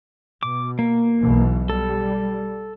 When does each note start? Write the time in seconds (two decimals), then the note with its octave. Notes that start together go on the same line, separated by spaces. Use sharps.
0.43 B2 D6
0.79 A#3
1.20 B1 B2 E3
1.70 G3 A4